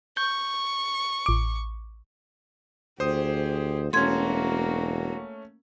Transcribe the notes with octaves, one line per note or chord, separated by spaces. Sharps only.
C#6 G6
A1 D6
D2 G4 G#4 C5 D#6
E1 A3 A#3 C#4 F#4 C6 G#6